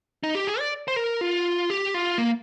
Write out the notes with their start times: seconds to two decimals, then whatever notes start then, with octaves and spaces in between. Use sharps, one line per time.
0.23 D#4
0.35 G4
0.47 G#4
0.59 D5
0.88 C5
0.96 A#4
1.21 F4
1.70 G4
1.94 F4
2.18 A#3